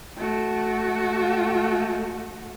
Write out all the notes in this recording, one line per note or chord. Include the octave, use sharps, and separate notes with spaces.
A3 F#4